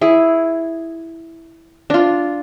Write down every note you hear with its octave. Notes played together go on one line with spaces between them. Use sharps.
E4 G#4
D4 F4